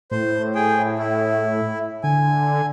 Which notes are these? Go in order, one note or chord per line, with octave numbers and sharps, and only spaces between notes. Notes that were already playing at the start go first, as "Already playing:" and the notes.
A2 C5
G#4 G5
E4
D3 G#5